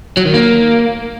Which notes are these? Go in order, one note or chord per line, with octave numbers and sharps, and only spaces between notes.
F#3
D#3
A#3